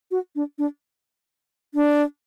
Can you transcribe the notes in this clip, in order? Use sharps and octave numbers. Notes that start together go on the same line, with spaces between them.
F#4
D4
D4
D4